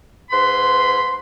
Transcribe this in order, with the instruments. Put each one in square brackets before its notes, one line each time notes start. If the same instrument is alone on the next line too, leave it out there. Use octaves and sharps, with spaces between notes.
[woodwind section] G#2 B4 B5 C6